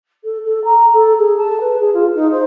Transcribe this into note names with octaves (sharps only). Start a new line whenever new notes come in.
A4
A4
A#5
A4
G#4
A5
B4
G#4
F4
D#4
C5